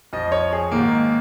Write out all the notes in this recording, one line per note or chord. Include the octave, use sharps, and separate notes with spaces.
F2 F3 D#5
C#5
G#4
G#2 D#3 A#3